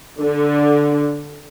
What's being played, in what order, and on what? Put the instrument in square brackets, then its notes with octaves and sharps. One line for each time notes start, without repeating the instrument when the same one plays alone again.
[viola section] D3